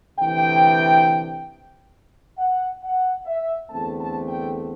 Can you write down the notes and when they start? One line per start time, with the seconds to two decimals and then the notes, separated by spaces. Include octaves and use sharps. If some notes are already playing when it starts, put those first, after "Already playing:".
0.18 D2 C3 E3 G5
2.38 F#5
2.82 F#5
3.26 E5
3.69 E2 D3 A3 C4 A5
3.99 A5
4.28 G5